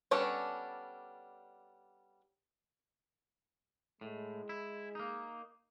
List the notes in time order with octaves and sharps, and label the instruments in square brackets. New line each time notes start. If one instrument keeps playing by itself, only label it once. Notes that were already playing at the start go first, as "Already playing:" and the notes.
[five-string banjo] G3 B3 C#4 D4 A4
[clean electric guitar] A2 [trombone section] G#3
[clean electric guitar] E4
A#3 D#4